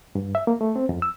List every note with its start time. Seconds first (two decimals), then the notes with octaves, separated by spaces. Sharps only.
0.15 G2
0.35 E5
0.47 A#3
0.61 A3
0.76 C4
0.89 F2
1.02 E6